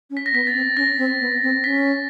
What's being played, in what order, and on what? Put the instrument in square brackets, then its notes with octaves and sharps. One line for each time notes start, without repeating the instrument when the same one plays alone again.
[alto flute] C#4
[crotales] B6
A#6
[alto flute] B3 [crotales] B6
[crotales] A6
[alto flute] C4
[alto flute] C#4 [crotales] A#6
[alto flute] C4
B3
C4
[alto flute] C#4 [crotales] B6